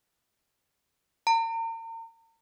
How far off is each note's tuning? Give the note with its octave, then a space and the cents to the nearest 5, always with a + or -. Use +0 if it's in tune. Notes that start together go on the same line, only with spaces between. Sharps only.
A#5 -40